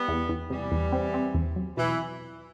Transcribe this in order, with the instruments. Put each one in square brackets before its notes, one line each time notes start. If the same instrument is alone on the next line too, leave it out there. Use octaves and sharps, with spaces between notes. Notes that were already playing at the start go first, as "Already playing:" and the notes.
Already playing: [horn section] G3 B3
[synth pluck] E2
E2
[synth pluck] C3 [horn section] E3 G3
[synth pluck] E2
C4
C4
E2
F#3
[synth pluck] B2 [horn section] E3